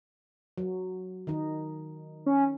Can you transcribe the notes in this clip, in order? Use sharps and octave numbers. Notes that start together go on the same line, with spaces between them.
F#3
D#3 D#4
C#4